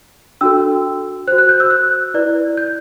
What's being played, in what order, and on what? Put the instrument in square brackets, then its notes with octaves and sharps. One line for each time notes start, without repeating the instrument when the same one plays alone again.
[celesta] D4 F#4 A4 E6
C5 F#6
F#4
F#6
G6
E6
F#6
E4 B4 D5
G6